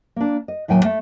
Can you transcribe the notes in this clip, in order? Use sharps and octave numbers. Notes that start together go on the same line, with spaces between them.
A#3 D4
D#5
D#2 A2 F#3 G5 G#5
A3